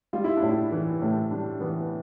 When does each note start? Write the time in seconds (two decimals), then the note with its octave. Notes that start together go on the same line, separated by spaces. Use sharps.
0.13 G3 F4
0.24 E4
0.37 D4
0.42 A2
0.49 E4
0.71 E3
1.02 A2
1.31 G3 D4
1.60 E3 B3